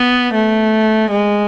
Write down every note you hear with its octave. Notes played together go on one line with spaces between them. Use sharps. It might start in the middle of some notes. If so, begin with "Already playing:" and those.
Already playing: B3
A3
G#3